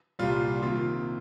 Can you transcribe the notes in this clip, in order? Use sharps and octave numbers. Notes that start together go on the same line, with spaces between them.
C2 A#2 G3 F4
C3 D#3 A#3 F4